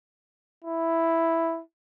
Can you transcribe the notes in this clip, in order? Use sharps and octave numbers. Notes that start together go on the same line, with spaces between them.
E4